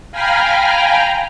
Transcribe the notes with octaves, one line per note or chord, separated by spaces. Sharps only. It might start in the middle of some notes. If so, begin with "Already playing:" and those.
F5 G5 G#5 A#5 B5 F6